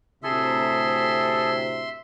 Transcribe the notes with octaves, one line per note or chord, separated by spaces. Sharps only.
D2 A2 C3 G#4 A4 E5 C6